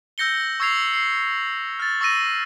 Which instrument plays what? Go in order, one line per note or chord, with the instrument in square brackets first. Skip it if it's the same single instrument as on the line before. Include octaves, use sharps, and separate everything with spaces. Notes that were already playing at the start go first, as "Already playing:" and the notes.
[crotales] E6 G6 A#6 C#7 G7
C#6 E6 G#6 C7 F7
C7
F6 A6
C#6 E6 A#6 D#7